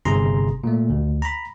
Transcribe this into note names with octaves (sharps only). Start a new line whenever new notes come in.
G1 C3 G#4 A#5 C6
A#2 A3
D2
A#5 B5